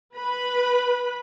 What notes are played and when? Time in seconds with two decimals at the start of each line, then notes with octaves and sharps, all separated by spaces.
0.15 B4 B5